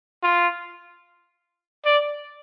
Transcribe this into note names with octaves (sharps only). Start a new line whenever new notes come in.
F4
D5